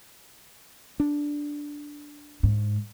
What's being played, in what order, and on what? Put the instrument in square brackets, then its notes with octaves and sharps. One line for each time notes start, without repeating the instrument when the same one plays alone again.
[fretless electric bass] D4
[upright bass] G#2